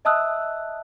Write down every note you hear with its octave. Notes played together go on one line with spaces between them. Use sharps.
D#5 E5 A5 D#6 E6 F#6